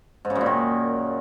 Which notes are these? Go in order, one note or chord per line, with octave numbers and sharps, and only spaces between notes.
G#2
C#3
F#2
A#2
D#3